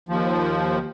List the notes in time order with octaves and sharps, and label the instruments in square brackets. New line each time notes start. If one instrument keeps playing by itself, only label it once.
[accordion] D#2 F3